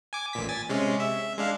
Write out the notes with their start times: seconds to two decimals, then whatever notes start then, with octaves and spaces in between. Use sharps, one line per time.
0.13 G#5 D6
0.33 A1 A#2 B6
0.49 G#5 A6
0.69 C3 G#3 C#4
1.00 E5
1.38 G#3 D4 F5